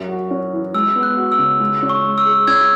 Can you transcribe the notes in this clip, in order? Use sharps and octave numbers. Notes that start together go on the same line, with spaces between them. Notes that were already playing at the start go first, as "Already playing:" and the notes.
Already playing: F#2 E5
F#4
C#4
E3
G#3 E6
B3
F#6
F#4
E6
C#3
G#3
C#4
C#6
G#3
E6
G#4
C#4 E6 G#6